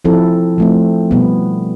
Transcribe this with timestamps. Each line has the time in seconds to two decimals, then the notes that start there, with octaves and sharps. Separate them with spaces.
0.05 F3 C4 E4 A4
0.58 F3 A3 C4
1.11 B2 G3 B3